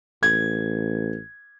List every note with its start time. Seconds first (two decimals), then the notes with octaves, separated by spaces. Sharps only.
0.23 A1 G#6